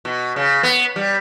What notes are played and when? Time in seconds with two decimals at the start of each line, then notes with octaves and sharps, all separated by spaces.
0.05 B2
0.36 C#3
0.63 B3
0.96 G3